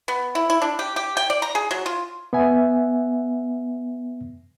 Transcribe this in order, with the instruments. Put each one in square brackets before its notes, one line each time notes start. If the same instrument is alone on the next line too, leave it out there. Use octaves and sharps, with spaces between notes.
[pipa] B3
E4
E4
D4
G4
G4
G5
D5
A#5
G#4
F#3
F4
[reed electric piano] B3 E5 G#5